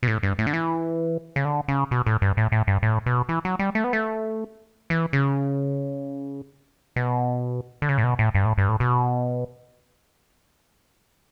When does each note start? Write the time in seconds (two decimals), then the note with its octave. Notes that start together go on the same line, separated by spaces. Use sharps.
0.03 B2
0.08 A2
0.23 G2
0.39 A2
0.47 D3
0.53 E3
1.36 C#3
1.45 D3
1.68 C#3
1.91 B2
2.06 A2
2.22 G2
2.37 A2
2.52 A2
2.67 G2
2.83 A2
3.06 B2
3.29 E3
3.45 F#3
3.59 G3
3.75 A3
3.84 B3
3.93 A3
4.90 E3
5.13 C#3
6.96 B2
7.82 D3
7.89 C#3
7.98 A2
8.04 B2
8.19 A2
8.35 G2
8.45 A2
8.58 G2
8.69 A2
8.80 B2